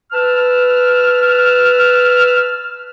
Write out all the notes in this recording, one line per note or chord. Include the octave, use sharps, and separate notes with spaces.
B4 A5 E6 F6